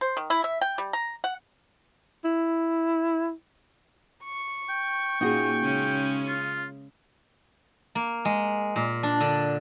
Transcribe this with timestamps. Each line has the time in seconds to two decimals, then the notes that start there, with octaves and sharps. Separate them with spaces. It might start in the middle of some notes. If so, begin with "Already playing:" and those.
0.01 C5
0.17 D#3
0.30 E4
0.44 E5
0.61 G5
0.78 G3
0.93 A#5
1.24 F#5
2.25 E4
4.24 C#6
4.69 G5
5.21 A#2 A#3 C#4 D#4 F#4 G#4 G5
5.62 C#3 G#3 C#4
6.28 F4
7.95 A#3
8.25 G#3
8.76 A#2
9.03 D4
9.20 D3